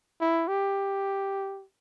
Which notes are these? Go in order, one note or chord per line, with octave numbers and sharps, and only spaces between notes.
E4
G4